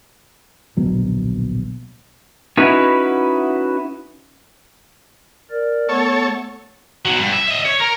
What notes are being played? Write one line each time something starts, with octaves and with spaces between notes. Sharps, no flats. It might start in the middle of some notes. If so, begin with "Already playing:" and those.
D1 A#1 B2 F#3
C#4 D#4 E4 F#4 B4
A#4 D5
A3 B3 A4 C#5
B2 F#3
G2
E5
D#5 E5
C#5
A#4